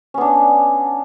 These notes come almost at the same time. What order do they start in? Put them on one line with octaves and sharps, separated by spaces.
C#4 B3 D4